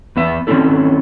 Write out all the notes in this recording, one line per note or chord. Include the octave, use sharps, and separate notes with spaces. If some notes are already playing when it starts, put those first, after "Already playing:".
E2 B3 E5
D#3 F#3 C4 C#4 E4 A4